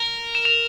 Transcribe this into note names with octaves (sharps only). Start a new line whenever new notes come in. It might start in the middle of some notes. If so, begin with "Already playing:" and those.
Already playing: A#4
E7
F7